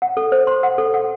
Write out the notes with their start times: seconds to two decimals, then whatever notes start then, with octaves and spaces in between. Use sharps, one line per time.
0.02 F#5
0.17 A4
0.32 C5
0.47 C6
0.63 F#5
0.78 A4
0.94 F#5